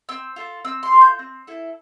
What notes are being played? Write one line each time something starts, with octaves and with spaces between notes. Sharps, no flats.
C4 E6
F4 A4
C4 E6
C6
F4 A4
G6
C4
E4 A4